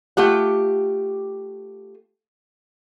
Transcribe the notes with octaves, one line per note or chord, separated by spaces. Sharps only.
A3 F4 G4 F#5